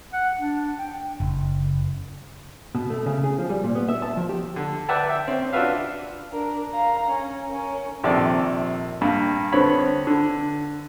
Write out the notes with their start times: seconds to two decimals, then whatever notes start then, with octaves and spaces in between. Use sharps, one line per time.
0.13 F#5
0.39 D4
0.79 G5
1.20 F#1
2.75 B2
2.90 A3
3.06 C#3
3.24 G#4
3.38 F3
3.50 G3
3.64 A#2
3.75 B3
3.88 E5
4.02 A5
4.17 F3
4.29 G4
4.56 D3
4.89 B4 D5 E5 F#5 G5 A5
5.09 E5 G5
5.27 C4 C#4
5.53 D4 F4 F#4 B4 E5 F5
6.32 D4 A#4
6.72 F5 A#5
7.09 C#4
7.49 C#4 A#4
8.04 A#1 C3 D#3 A4 D5
9.01 G2 A#3
9.52 D3 B3 C4 C#5 B5
10.07 D3